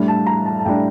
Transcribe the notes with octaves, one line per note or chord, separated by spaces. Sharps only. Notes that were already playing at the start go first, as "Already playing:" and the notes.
Already playing: A2 G3 D4
A5
A#5
A5
A5
A2 G3 D4 G5